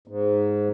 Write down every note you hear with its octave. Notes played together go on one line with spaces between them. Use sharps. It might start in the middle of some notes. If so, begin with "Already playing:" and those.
G#2